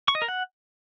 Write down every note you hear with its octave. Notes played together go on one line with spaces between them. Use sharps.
C#6
D#5
A#4
F#5